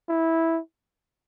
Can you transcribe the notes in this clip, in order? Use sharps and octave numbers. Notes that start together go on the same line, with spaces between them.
E4